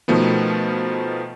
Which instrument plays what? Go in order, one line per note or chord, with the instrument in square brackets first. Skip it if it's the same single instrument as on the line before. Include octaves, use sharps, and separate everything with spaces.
[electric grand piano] B2 D#3 F3 A3 B3